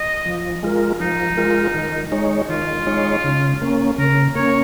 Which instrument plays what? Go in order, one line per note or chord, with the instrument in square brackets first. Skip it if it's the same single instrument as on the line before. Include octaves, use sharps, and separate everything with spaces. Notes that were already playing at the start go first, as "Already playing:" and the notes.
Already playing: [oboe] D#5
[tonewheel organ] F3
G#3 F4 A#4
[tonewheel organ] F3 [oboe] D#4
[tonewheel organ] G#3 F4 A#4
D#3
G#3 D#4 C#5
[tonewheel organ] D#3 [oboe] F4
[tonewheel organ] G#3 D#4 C#5
C#3
A#3 C#4
[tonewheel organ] C#3 [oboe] A#4
[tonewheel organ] A#3 C#4 [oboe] C#5